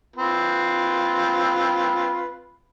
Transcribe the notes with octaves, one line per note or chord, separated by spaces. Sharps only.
C4 F4 B4